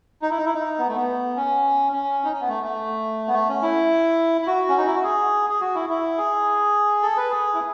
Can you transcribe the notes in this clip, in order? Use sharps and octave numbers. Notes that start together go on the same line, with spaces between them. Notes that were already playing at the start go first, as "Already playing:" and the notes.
D#4
E4
D#4
E4
D#4
B3
A3
B3
C#4
C#4
D#4
C#4
B3
A3
A3
B3
A3
C#4
E4
E4
F#4
C#4
D#4
E4
F#4
G#4
G#4
F#4
E4
E4
G#4
A4
B4
G#4
E4